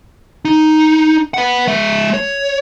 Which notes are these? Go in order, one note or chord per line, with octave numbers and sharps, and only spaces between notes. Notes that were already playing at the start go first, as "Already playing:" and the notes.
D#4
B4 F#5
G#3 E5
C#5